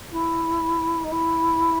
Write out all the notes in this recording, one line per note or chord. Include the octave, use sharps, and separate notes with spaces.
E4
D#4
E4